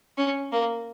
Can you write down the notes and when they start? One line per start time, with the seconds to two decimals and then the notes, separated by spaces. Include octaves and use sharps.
0.18 C#4
0.52 A#3